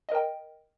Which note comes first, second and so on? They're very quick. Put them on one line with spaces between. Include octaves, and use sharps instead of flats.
D#5 A#4 G5